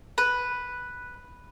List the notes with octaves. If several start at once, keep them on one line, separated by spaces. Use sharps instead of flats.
B4